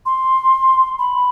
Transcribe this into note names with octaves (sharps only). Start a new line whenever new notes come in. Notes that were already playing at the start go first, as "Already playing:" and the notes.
C6
B5